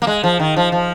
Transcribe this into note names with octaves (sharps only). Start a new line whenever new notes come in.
A#3
G#3
F3
D#3
F3
F3